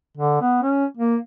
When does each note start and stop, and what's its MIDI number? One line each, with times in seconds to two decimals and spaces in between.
0.17 0.37 50
0.41 0.62 59
0.63 0.85 61
0.97 1.17 58